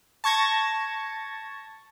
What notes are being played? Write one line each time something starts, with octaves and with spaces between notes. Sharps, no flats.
A5 C#6 G#6 A#6